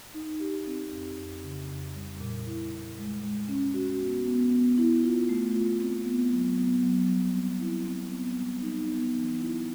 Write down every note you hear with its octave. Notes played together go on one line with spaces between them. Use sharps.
D#4
G4
C4
F2
F2
C#3
F2
G3
A#2
E4
A#2
G#3
G#3
C#4
F#4
B3
B3
B3
E4
F4
A3
F4
C4
B3
F#3
B3
F#3
G3
C4
E4
C4
B3
G3
D#4
B3
E3
E4